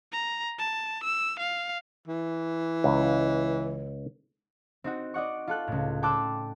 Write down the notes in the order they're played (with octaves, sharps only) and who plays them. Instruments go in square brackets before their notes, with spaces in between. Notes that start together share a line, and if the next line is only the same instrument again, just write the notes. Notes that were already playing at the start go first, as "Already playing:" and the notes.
[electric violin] A#5
A5
E6
F5
[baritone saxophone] E3
[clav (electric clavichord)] C#2
[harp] C4 D#4 F#4
D5 D#5 F#5 C#6
F4 A4 F#6
C#2 A2
G5 A5 C6 D6 E6 F#6